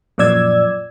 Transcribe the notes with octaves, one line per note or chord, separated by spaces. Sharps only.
F#2 A#2 F3 D5 E6 G#6